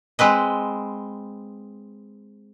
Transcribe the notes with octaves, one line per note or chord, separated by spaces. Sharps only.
G#3 C4 B4 D#5